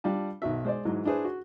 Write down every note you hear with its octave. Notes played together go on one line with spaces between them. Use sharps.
G3 D4 F4 A5
B1 D#3 F#4 E5
G#3 C5 D5
G#2 E3 F#3 G#3
D4 E4 G#4 B4 C5
F#4